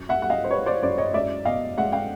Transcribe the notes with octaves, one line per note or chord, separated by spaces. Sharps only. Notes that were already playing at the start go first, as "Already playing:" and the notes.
Already playing: F#2
E5 F#5
G3 F#5
D#5 F5
C5
G3 B4 C#5
C5 D5
F#2 C5 D5
C#5 D#5
G#3 D5 E5
B2 D#5 F5
G#3 E5 F#5
F5 G5